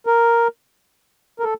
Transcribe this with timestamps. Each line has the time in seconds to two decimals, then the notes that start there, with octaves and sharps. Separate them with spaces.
0.06 A#4
1.40 A#4
1.44 A4